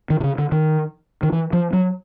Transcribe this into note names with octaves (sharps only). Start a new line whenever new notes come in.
D#3
C3
C#3
D3
D#3
D#3
E3
F3
F#3